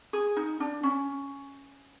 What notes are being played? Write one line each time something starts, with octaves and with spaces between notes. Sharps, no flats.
G#4
D#4
D4
C#4